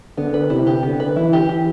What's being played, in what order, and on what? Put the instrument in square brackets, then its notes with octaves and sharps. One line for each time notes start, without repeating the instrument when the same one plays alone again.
[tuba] D3 [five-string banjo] B3
[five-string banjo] B4
[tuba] C3 [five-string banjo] E4
[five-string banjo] G4
[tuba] D3 [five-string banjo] B3
[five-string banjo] B4
[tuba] E3 [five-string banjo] E4
[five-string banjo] G4
E3